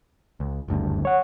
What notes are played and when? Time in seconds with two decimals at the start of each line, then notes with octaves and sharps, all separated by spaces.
0.40 C#2
0.68 F#1 D2 G2
1.05 C#5 F#5